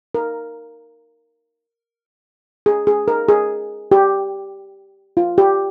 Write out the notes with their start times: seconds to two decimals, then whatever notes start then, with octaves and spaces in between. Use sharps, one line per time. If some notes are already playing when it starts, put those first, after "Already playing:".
0.15 A#4
2.66 G#4
2.87 G#4
3.08 A#4
3.29 G#4
3.91 G4
5.17 F4
5.38 G4